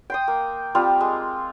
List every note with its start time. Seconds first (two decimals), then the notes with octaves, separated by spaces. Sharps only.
0.10 G5 C6 D#6
0.28 A#3
0.75 G3 C4 F4
1.01 G#3